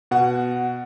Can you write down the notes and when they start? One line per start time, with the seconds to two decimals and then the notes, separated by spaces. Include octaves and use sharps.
0.11 B2 F#5